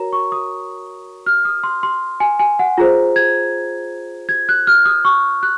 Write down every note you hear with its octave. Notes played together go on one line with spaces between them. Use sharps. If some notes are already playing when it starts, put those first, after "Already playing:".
Already playing: F#4 A#4 C#5 A#5
C#6
D#6
F6
D#6
C6
C6
G#5
G#5
F#5
F4 G#4 C5 A#5
G#6
G#6
F#6
F6
D#6
C#6
F#6